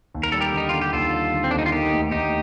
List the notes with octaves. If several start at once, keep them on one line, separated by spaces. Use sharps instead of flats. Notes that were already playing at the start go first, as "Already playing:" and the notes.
D#2
A#4
G3 A4
G4 A#4
D3 D#4
D3 F4
G4
D#2 F4 A4
G3
D3
C4
D#2 D4
D#4
F4
A#3 D#4 G4
D2
D2 D#4 G4